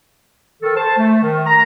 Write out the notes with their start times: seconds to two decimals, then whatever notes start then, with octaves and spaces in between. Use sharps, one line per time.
0.62 D#3 A4
0.76 C5 A5
0.98 A3
1.22 D#3
1.47 A#5